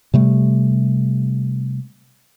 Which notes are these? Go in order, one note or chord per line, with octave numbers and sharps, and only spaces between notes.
C3 G3 A3